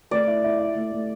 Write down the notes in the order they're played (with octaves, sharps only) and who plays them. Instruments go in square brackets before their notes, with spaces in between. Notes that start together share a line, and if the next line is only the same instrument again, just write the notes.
[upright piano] A3 [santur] D5
[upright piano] E4
E4
E4
A3
A3